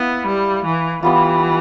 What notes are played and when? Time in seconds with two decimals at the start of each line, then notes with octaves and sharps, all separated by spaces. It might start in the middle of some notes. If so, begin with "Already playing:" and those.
Already playing: B3 E4 F5
0.26 G3
0.64 E3
1.03 E3 G3 B3 F4